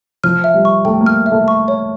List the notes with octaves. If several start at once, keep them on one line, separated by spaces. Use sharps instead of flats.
F3 F6
E5
G3
C#6
A3 G5
A#3
F6
E5
A3
C#6
C#5